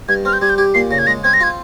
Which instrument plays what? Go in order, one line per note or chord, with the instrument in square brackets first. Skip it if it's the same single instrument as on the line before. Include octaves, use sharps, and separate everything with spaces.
[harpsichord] G2 [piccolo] G#6
[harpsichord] C4 [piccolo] F6
[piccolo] G6
[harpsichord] G3 [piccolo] G#6
[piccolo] G6
[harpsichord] G4 [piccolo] G#6
[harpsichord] A#2 [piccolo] C7
[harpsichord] C#3 [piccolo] A#6
[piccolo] G#6
[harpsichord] G#3 [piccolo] A#6
[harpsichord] C4 [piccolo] G#6
[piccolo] A#6
[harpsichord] F4 [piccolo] G#6